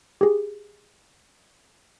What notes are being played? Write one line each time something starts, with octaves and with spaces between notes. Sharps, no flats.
G4 G#4